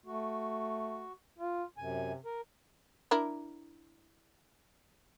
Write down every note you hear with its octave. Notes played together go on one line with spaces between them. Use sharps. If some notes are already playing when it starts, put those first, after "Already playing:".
A3 F#4
F4
F#2 C3 G#5
A#4
D4 E4 A#4